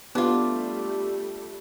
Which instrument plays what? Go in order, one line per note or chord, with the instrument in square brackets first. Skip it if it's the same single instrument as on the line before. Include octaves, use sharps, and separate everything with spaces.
[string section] G3 A3 [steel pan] B3 G4 [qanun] D4 F4